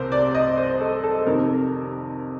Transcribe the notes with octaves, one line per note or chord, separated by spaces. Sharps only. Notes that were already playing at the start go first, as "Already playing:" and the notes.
Already playing: C2 C3 A#4 C5
D5
D#5
C5
A4
A4
F2 C3 D#3 A#4